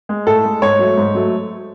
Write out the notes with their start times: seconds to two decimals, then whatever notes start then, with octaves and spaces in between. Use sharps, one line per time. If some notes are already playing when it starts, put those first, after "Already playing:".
0.09 G#3
0.27 A2 A4
0.45 G#3
0.62 G#2 C#5
0.79 F#3 A3
0.97 G#2
1.15 F#3 A3